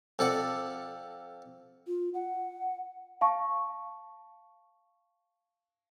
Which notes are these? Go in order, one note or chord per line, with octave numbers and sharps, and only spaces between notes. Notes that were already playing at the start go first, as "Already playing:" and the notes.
F2 A4 D5 F#5
F4
F#5
F5 A5 C#6